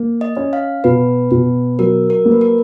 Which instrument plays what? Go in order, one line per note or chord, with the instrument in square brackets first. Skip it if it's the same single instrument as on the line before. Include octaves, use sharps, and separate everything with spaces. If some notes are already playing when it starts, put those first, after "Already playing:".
Already playing: [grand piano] A#3
[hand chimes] D#5
[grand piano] C#4
[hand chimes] F5
[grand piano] B2 [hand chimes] B4
[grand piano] B2
[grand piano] F#3 [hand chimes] A#4
[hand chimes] A#4
[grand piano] A#3
[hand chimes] B4
A#4